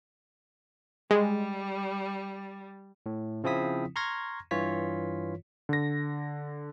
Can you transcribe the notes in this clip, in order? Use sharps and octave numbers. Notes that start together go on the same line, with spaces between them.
G3 G#3
A2
C#3 F3 C4 E4 D#6 B6
A#5 C6 C#6 F6 G#6 A#6
G2 E3 F4 C#5 B6
D3 A#6